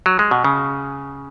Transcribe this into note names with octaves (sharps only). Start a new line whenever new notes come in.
F#3
G#3
B2
C#3